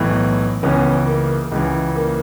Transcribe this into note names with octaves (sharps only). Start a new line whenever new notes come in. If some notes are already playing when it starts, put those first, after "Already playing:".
Already playing: B1 A2 E3
C#2 C#3 E3 B3 C#4
A#3
C#2 C#3 E3
A#3